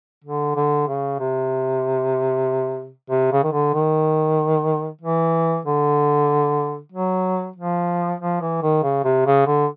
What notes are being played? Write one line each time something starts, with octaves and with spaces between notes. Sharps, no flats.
D3
D3
C#3
C3
C3
C#3
D#3
D3
D#3
E3
D3
F#3
F3
F3
E3
D#3
C#3
C3
C#3
D3